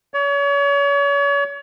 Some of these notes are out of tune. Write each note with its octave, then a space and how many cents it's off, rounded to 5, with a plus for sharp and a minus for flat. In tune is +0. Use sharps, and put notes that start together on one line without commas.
C#5 +35